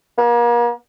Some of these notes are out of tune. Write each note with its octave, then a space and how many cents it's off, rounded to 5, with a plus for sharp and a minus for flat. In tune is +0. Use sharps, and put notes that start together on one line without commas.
A#3 +40